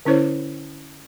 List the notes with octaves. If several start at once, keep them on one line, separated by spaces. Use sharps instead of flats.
D3 C#4 E4 C5 C#5